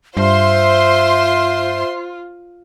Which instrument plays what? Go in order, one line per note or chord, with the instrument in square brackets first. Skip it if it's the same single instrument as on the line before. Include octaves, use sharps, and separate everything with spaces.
[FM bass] G2 [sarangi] F4 [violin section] C5 C6 [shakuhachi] E5